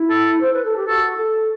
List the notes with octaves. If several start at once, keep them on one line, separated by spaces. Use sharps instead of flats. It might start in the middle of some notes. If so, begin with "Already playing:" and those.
Already playing: E4
A4
C5
B4
A4
G4
F#4 A4
A4